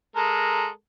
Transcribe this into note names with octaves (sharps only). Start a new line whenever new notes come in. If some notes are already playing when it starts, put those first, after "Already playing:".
G#3 A4 A#4